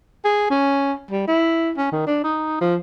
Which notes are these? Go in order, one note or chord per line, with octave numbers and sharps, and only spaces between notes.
G#4
C#4
G3
E4
C#4
D#3
D4
D#4
F3